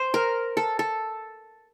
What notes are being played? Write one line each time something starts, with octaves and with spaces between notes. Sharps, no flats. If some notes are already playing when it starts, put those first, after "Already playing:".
Already playing: C5
A#4
A4
A4